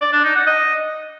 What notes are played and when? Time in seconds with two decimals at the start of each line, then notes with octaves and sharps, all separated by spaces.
0.01 D5
0.13 D4
0.24 D#4
0.35 F#5
0.46 D#5